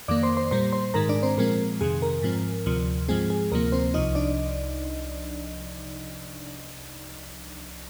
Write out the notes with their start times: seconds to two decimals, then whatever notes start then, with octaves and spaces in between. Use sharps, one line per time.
0.08 F2 D#3 A#3 D5 D6
0.23 C5 C6
0.37 C5 C6
0.51 A#2 G3 A#3 C5 C6
0.72 C5 C6
0.94 G#2 D#3 G#3 A#4 A#5
1.09 D4 D5
1.23 C4 C5
1.38 A#2 F3 G#3 C4 A#4
1.81 F2 C3 D#3 G#4
2.02 A#4
2.23 G#2 F3 C4
2.66 D2 C3 F3
3.08 G#2 F3 G#3 C4 G#4
3.30 G#4
3.52 D2 C3 F3 A#3 A#4
3.72 C4 C5
3.94 C2 C3 F3 D#4 D#5
4.15 D4 D5